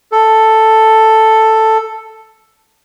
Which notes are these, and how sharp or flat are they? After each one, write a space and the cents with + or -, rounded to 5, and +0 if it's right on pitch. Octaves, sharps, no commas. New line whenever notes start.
A4 +5